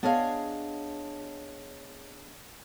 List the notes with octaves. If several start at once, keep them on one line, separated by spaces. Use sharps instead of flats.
B3 D4 G#4 C#5 D#5 F5